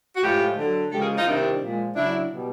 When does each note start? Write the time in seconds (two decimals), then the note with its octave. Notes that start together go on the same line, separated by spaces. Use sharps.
0.17 F#4
0.23 A2 F3 G#3 F4 G4
0.58 D3 F#3
0.92 C#3 F3 G#3 G4 A4
1.01 G#4 A#4
1.18 D#4 F4
1.26 C3 D#3 G3 D4 E4
1.61 A#2 F3 G#3
1.95 C#3 F#3 D4 E4
2.30 B2 G3